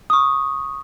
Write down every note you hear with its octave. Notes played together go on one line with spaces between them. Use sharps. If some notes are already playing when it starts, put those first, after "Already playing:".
C#6 D#6